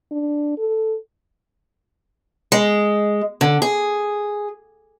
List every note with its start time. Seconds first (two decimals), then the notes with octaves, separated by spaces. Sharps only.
0.12 D4
0.58 A4
2.52 G#3
3.41 D3
3.62 G#4